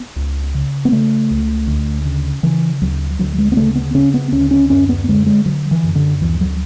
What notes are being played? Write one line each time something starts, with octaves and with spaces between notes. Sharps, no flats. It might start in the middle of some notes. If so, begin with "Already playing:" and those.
Already playing: B3
C#2
C#3
B3
C#3 A3
C#2
D2
C#3
C#3 E3
D2 F#3
D2 F#3
G#3
B3
C#3 A3
B3
C#3 C#4
B3
D2 C#4
C#4
F#2 C#4
B3
D3 G#3
G#3
D3 F#3
E3
F#2
D3
D2 E3
F#3